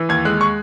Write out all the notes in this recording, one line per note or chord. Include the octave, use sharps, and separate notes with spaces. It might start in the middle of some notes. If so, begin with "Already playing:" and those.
Already playing: E3
D#2 G#6
G#3 F#6
C#6